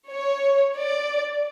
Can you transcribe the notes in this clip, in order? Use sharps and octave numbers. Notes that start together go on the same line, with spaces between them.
C#5
D5